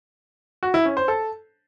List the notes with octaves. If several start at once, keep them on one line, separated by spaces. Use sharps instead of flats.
F#4
E4
C#4
C5
A4